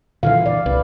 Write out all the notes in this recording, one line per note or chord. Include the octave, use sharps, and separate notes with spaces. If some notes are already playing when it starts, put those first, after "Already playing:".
A#2 D3 E3 F5
D5
C2 B4